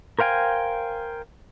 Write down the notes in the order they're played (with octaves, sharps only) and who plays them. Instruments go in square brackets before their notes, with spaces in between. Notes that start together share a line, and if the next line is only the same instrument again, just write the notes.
[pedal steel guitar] A#4 C5 F5 G5 G#5